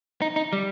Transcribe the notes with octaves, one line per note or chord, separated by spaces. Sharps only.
D#4
D#4
G3